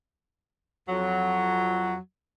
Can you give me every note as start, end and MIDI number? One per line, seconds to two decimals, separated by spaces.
0.88 1.95 41
0.88 1.95 54